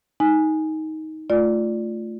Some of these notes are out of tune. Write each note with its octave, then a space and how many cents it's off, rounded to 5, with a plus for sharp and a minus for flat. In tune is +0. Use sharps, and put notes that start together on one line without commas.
D#4 +15 G#5 +0
A3 +0 F4 +0 D5 +0